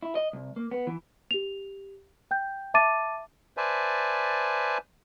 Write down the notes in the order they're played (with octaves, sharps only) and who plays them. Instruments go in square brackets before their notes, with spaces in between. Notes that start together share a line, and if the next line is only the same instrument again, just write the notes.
[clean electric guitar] E4
D#5
C2
A#3
B3
E3
[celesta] G4 F7
G5 G6
E5 A5 D6 A6 D#7
[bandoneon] B4 C5 D5 E5 G#5 A5